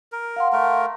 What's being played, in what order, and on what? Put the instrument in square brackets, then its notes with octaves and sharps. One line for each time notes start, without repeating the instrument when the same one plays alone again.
[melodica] A#4
[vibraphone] F5 F#5 C6
[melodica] A3 A#4